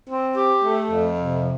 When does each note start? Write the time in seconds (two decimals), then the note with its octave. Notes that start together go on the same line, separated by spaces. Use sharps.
0.09 C4
0.36 G4
0.63 A3
0.91 F2
1.17 C3